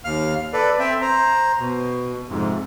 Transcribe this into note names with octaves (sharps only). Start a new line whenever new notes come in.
D#2 F5 F6
A4 B4 D5
C4 E5 G5
C5 A#5
B2
F2 G#2 C3